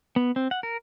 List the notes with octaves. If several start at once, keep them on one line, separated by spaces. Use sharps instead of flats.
B3
C4
F#5
A#4